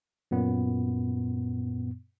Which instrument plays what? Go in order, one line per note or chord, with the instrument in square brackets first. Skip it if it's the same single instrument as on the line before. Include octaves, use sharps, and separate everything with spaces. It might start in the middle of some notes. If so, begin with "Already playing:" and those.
[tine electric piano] F#2 A#2 B3